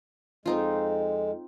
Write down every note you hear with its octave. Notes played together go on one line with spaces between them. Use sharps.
F2 G#3 C4 D#4 F4